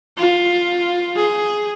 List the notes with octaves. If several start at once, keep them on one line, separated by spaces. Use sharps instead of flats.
F4
G#4